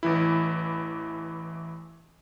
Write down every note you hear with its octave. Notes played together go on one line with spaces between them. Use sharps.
A1 E3 E4